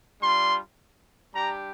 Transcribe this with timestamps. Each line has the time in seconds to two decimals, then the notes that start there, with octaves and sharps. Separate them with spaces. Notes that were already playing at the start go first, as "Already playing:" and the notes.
0.21 G3 D4 F4 C6
1.33 G3 D4 G4 A#5